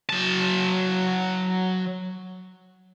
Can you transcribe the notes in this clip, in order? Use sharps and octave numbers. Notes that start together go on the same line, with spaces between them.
F#3 A5